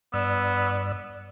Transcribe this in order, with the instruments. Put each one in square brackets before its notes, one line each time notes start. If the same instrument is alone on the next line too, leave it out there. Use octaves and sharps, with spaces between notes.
[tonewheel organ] G2 D5 E6 [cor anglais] B3